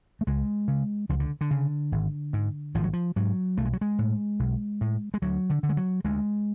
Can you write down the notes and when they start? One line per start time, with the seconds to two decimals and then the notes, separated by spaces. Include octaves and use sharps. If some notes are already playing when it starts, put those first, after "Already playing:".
0.21 A3
0.27 C#2 G#3
0.68 C#3
1.09 C#2 F3
1.20 D3
1.41 D3
1.51 C#3
1.92 G#1
2.33 G#2
2.74 G#1 F3
2.84 F#3
2.93 F3
3.16 G#2 F#3
3.57 B1 A3
3.65 G#3
3.73 F#3
3.81 G#3
3.99 A2
4.39 B1
4.81 A2
5.14 G#3
5.22 D2 F#3
5.50 D3
5.63 D3
5.69 G#3
5.77 F#3
6.04 D2 G#3